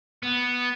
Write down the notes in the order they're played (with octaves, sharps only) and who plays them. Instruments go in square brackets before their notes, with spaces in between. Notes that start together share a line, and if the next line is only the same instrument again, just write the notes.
[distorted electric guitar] B3